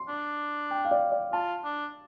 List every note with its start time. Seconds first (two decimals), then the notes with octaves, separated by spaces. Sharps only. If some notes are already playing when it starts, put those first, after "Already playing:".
Already playing: C6
0.08 D4
0.71 G5
0.85 F5
0.91 D5
1.12 D5
1.33 F4 A5
1.64 D4